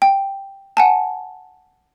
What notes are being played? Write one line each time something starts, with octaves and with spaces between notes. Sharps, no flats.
G5
F#5 G#5 A5